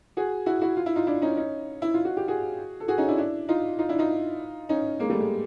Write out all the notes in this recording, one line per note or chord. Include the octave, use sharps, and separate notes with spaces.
F#4 G#4
E4 F#4
E4 F#4
F4
E4
D#4 F4
D4 E4
C#4 D#4
C#4 D#4
E4
F4
F#4
G4
F#4 G#4
A4
F#4 G#4
C#4 D#4
D4 E4
D4 E4
D#4 F4
D#4 F4
D4 E4
D#4 F4
C#4 D#4
G#3 A#3
G3 A3
G#3